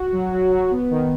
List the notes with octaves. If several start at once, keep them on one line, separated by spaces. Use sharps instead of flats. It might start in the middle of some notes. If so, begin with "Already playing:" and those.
Already playing: F#4
F#3
F#3
F#3
B3
D#3